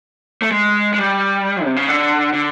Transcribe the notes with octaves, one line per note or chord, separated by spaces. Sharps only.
A3
G#3
G#3
G3
C3
C#3
D3
D3